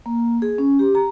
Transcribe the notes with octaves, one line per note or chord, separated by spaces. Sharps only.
A#3
G#4
C#4
G4
A#5